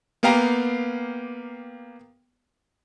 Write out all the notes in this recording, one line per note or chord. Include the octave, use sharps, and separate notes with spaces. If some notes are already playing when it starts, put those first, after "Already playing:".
A#3 B3 G4 F5 G5 A#5